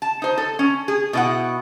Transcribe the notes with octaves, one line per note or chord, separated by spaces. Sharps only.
A5
D#4 C5
A4
C#4
G#4
B2 E4 F#5